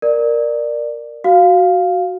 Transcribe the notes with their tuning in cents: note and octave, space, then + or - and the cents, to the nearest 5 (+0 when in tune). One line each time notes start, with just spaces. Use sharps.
A#4 +0 D5 +15
F#4 +0 F5 +0